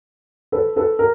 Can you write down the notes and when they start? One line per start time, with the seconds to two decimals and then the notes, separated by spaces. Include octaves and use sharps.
0.52 A4 B4
0.76 A4 B4
0.99 A#4